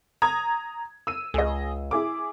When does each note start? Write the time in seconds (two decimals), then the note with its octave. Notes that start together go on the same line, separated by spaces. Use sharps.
0.22 A#5 D#6 G#6
1.07 E6 D#7
1.34 C#2 G#4 D#5
1.91 E4 G#4 D6